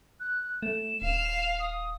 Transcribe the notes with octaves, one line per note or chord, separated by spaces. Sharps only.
F#6
A3 E7
D#1 F5
D#6